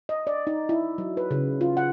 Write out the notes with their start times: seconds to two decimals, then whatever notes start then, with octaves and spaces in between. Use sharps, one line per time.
0.09 D#5
0.27 D5
0.47 D#4
0.69 E4
0.98 F#3
1.17 B4
1.31 C#3
1.61 F4
1.77 F#5